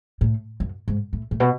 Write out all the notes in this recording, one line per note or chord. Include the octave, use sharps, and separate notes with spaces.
A2
F#2
G#2
A2
A2
B2